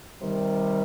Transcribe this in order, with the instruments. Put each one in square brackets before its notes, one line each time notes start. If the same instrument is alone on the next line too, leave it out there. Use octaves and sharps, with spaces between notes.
[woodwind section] C3 D#3 G3